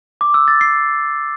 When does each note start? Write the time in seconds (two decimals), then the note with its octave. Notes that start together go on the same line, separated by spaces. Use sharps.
0.21 D6
0.34 E6
0.48 A6
0.61 C7